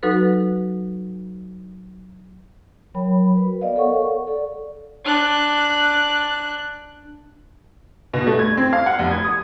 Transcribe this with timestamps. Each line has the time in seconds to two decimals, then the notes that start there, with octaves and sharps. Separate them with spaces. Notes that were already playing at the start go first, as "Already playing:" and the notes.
0.03 F#3 D#4 F#4 A4 B4
2.94 F#3 A#4 C#5 G5 B5
3.34 F#4 A#4 B4
3.61 B3 D5 D#5 F5
3.76 A4 A#4 C#5 F5 F#5 C#6
4.27 A4 D5
5.05 D4 F#6
8.13 B2
8.27 A3
8.39 G#6
8.57 C4
8.73 F5
8.86 F#5
8.99 F1
9.11 G#6
9.24 D#6